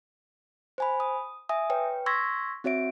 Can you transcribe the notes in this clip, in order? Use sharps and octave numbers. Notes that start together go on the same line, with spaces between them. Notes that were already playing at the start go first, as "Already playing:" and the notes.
C5 G#5 B5
D#6
E5 G#5 D#6
B4 C#5 G5
C6 C#6 E6 G#6 A#6 B6
C4 F#4 C#5 E5 D7